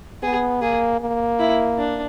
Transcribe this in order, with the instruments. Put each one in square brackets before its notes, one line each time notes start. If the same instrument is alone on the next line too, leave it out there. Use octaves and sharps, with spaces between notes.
[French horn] B3 [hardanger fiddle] G#4
[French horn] A#3 [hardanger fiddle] G#4
[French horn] A#3
[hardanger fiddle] E4
D4